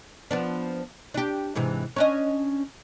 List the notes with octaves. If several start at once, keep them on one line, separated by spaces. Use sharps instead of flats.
F3 B3 D4
D4 G4
G#2 C3 E3
C#4 D4 D#5